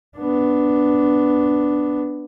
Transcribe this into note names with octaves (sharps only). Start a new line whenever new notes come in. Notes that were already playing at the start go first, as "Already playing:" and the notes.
B3 D4